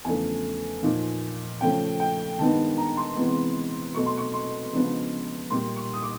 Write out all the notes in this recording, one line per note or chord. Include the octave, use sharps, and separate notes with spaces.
E2 C#3 F3 A3 D4 G#5
A#2 F3 A#3 D#4
C#3 F3 A3 C#4 G5
G5
G2 D#3 G#3 B3 D#4 A5
A#5
C6
C3 E3 G#3 B3
B2 F#3 A3 C#6
C6
C#6
C6
C#3 F3 G#3 B3 D4
A#2 G3 A#3 C6
C#6
D#6
D6